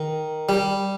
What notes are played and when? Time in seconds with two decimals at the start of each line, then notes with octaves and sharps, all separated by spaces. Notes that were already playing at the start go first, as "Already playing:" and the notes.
Already playing: D#3
0.49 G3